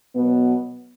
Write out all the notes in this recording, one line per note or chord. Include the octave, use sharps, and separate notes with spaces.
B2 F#3 B3